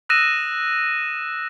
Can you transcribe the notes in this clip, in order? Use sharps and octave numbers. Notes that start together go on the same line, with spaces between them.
D#6 E6 F#6 A#6 D#7 E7